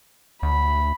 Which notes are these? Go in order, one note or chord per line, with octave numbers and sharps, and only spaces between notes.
D2 B5